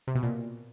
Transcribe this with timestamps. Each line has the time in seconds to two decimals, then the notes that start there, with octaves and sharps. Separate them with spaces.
0.08 C3
0.15 B2
0.23 A#2